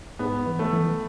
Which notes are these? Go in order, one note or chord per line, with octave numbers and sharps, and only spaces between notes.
G#2 B3
E3
A3
E3